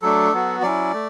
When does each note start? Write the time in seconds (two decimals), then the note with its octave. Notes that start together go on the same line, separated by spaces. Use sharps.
0.02 F#3 A3 D4 A4
0.32 F#3 B3 F#4
0.62 F#3 C#4 E4 D5
0.93 A3